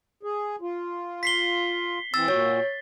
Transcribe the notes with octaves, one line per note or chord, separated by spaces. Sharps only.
G#4
F4
B6 C7 G7
E3 C4 E6 A6
A#2 F#4 C#5